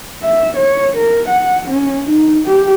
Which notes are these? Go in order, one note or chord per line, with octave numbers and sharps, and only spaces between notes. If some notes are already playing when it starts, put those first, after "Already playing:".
E5
C#5
A#4
F#5
C#4
D#4
G4